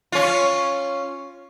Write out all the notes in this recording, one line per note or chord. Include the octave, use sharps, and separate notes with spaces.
C#4 F4